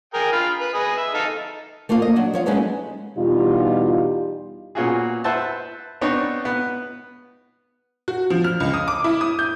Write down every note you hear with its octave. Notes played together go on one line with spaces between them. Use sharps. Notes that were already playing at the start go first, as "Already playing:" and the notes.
G#4 A#4 G5
F4 F5 B5
B4
G#4 B4 D#5
E5
D#4 A4 F5
A3 A#3 C4 F4 F5
D#5
F#3 D4 F#4
F3 C#5 F5
F#3 G#3 A3 C#4 D#4 B4
E2 B2 G3 D#4 F4
A#2 B3 C#4 F4 F#4 G#4
B4 C5 E5 F#5 A5
B3 C4 D4 D#4 C#5
B3 B4
F#4
F3
F6
C#2
D#6
D6
E4
D#6
G6